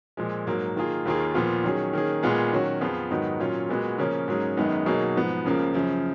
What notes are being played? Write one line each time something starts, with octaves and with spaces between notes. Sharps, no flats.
A#2 F3 G#3
G#2 F#3 A#3
D#3 A#3 F4 G#4
D#2 D#3 A#3 F4 G#4
A#2 F3 B3 F4
D#3 F#3 C#4 G#4
D#3 A#3 C#4 G#4
A#2 G#3 B3 F4 G#4
D#3 F#3 C#4 F#4
F2 F3 B3 F4 G#4
G#2 D#3 F#3 B3 D#4
A#2 F#3 C#4 F4
A#2 G#3 B3 F#4
C#3 F3 A#3 C#4
G#2 F#3 A#3 C#4 G#4
F#2 D#3 G#3 B3 D#4
B2 F#3 A#3 D#4 G#4
G#2 F3 B3
C#2 C#3 F3 A#3
F#2 C#3 F3